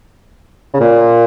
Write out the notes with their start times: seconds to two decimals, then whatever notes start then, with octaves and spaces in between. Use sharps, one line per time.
0.74 C#3
0.80 A#2